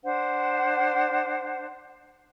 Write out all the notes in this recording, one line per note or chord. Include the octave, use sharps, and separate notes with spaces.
D4 C5 F#5